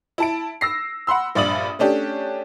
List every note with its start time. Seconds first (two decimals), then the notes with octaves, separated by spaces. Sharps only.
0.18 E4 A5 D7
0.61 E6 A#6 C7
1.07 F#5 B5 C6 E6
1.35 A#1 G2 D5 D#6 F#7
1.79 A3 C#4 D4 G4